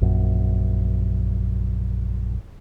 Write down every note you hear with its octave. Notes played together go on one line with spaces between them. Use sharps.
A#1 F#2